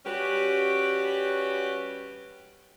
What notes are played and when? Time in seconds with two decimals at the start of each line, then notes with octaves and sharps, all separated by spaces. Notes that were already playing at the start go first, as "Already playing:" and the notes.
0.05 G3 C#4 F#4 G4 B4